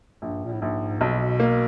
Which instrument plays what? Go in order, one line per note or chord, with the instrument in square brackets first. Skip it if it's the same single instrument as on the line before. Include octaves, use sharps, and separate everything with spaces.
[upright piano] A#1 [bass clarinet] G2
[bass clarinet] A#2
A2
[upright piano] A#1 [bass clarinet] G#2
[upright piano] B1 [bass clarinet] B2
[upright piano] A#3